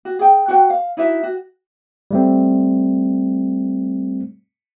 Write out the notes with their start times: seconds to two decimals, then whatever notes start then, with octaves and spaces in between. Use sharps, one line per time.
0.05 F#4
0.19 G#4 G5
0.48 F#4 F#5 G5
0.70 F5
0.97 D#4 E4 F#4 E5
1.23 F#4
2.11 G3 A3 C4